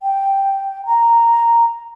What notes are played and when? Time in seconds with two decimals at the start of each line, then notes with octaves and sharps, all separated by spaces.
0.03 G5
0.86 A#5